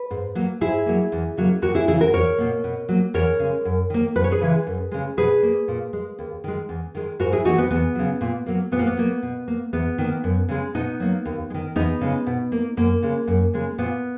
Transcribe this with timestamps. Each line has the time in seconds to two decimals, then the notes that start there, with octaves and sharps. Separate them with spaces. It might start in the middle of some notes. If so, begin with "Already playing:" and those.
Already playing: B4
0.11 G#2
0.35 F#3 A#3
0.61 G#2 E4 G#4
0.86 F#3 A#3
1.12 E2
1.37 C#3 F#3 A#3
1.62 D#2 F#4 A#4
1.75 E4 G#4
1.87 C#3 E3 E4 G#4
2.00 F#4 A#4
2.13 E2 A#4 C#5
2.38 B2 A#3
2.64 B2
2.89 F#3 A#3
3.14 E2 A#4 C#5
3.40 C#3 G#3
3.65 F#2
3.90 D#3 A#3
4.16 F#2 B4
4.24 C#5
4.31 G#4 B4
4.41 C#3 E3 G#3
4.67 F#2
4.92 C#3 G#3
5.17 B2 G#4 B4
5.43 A#3
5.68 A#2
5.93 G#3
6.19 D#2
6.44 D#3 G#3
6.69 E2
6.95 D#3 G#3
7.20 G#2 F#4 A#4
7.32 E4 G#4
7.45 E3 A#3 D#4 F#4
7.58 B3
7.71 E2 B3
7.95 C#3 F#3
8.21 A#2
8.46 F#3 A#3
8.72 A#2 B3
8.79 A#3
8.87 B3
8.97 F#3 A#3
9.23 B2
9.48 A#3
9.73 E2 B3
9.98 D#3 A#3
10.24 F#2
10.49 C#3 G#3
10.75 B2 B3 D#4
11.00 F#3 A#3
11.25 D#2
11.50 G#3
11.54 D#3
11.76 E2 B3 D#4
12.01 C#3 G#3
12.27 B2
12.52 A#3
12.77 F#2 A#3
13.03 C#3 G#3
13.27 F#2
13.54 C#3 G#3
13.78 A#2 B3